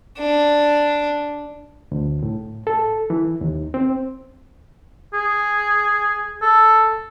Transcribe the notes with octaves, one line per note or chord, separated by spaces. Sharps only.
D4
D2
A2
A4
E3
D#2
C4
G#4
A4